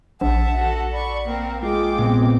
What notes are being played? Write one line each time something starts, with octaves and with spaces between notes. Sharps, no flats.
A#1 E5 F#5 A5
F#4 A4
D5 B5 C#6
A#3 C4 A#4
G#3 F4 G5 D6
A#2 B3 C4